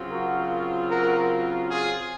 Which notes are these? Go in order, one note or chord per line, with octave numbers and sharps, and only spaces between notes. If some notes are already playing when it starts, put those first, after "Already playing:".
Already playing: C#3 F#3 C4 F4
F#4 A#4
F#4 A#4
F4 G#4